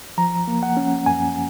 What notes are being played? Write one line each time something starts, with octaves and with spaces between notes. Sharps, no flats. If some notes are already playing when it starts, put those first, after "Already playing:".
F3 A#5
A#3
F#5
C#4
F#2 G#5